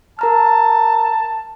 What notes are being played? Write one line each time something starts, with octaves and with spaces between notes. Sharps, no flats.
A#4 A5 A#5 F6